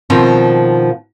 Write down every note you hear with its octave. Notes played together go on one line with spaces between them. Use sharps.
B2 D#3 F3 C4